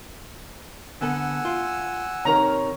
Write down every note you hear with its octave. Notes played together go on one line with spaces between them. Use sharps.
D3 B3 A4 F#5 G#5 E6
F4
C3 D#3 A#4 C#5 A#5